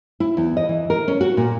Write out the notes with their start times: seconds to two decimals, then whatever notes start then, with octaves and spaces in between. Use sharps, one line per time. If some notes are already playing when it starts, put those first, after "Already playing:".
0.20 E4
0.37 E2
0.57 D#5
0.69 E3
0.90 A#4
1.08 C#4
1.21 F#4
1.37 A#2